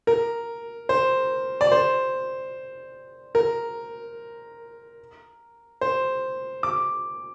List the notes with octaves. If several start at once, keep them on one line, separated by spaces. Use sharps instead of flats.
A#4
C5
D5
C5
A#4
C5
D6